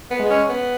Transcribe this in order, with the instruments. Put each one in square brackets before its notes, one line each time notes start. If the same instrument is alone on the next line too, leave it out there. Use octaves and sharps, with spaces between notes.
[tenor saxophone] B3
[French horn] G#3
[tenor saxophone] C#4
B3